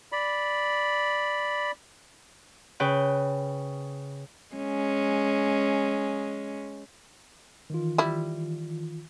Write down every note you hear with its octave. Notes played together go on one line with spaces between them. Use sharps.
D5 B5
C#3 B4 G5 F#6
G#3 C#4
D#3 E3 F4
G3 E4